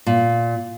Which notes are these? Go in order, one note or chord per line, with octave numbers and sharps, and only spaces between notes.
A#2